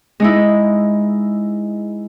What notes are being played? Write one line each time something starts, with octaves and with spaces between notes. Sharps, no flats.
G#3 D#4 E4